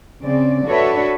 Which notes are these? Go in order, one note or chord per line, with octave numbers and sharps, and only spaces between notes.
C#3 C4 D5
D4 F#4 A4 B4 C#5 E5